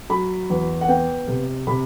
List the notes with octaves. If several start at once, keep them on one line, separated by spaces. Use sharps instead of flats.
F#3 B5
E2
F#5
B3 G5
C3
C3 B5